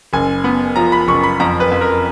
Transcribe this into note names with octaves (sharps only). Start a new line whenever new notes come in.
F#1 G#5
B3
F3 A#5
B5
F#1 C#6
B5
F2 A#5
B4
F2
A#4